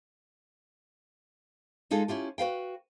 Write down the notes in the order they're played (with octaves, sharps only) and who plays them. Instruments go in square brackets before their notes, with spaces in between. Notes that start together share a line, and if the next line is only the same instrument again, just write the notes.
[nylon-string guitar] G#3 D#4 F4 G#4 A4
C#4 E4 F4 G4
F#4 B4 F5 G5